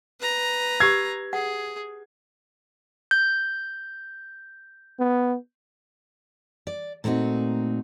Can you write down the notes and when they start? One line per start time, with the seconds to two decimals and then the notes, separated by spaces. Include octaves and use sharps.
0.21 B4 A#5
0.80 G4 E6 G#6 C7
1.33 G#4 F#5
3.11 G6
4.99 B3
6.67 D5
7.04 A#2 A3 C4 D#4 F#4